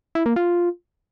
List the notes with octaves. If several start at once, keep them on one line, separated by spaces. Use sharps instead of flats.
E4
A#3
F4